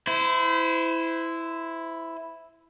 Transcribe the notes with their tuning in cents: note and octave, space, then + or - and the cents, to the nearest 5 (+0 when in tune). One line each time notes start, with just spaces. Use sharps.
E4 +0 C5 -30